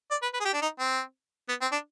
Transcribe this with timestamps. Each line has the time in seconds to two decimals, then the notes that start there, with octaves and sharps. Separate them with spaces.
0.11 D5
0.22 B4
0.34 B4
0.40 G#4
0.45 G4
0.54 D4
0.62 D#4
0.80 C4
1.49 B3
1.62 C4
1.72 D4